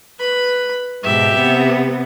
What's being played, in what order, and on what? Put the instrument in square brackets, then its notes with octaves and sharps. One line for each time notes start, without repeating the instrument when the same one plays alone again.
[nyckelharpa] B4 B5
[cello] G#2 B2 [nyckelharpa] G4 E5
[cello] C3 B3